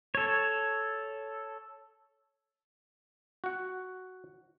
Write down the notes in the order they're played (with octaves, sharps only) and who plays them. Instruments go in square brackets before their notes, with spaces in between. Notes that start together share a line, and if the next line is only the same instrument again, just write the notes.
[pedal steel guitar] A4 C#5
[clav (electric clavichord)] F#4 F#5